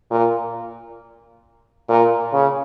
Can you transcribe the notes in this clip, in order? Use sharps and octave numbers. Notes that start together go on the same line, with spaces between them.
A#2
A#2
C#3